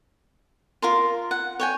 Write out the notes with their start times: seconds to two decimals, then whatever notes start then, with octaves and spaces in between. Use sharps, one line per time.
0.82 F4 A#4 C6
1.31 F#5
1.60 C#5 G5 G#5